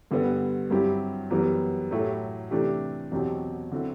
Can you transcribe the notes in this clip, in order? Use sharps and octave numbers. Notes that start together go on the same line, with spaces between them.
G2 D3 G3 B3
G2 F#3 C4 E4 G4
F#2 E3 G3 B3
A2 F#3 A3 E4 G4
C3 E3 A3 D4 G4
E2 B2 F#3 C4 G4
D3 F#3 C4 E4